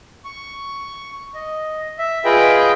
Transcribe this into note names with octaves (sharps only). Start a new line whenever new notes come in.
C#6
D#5
E5
F4 G#4 B4 D#5 G5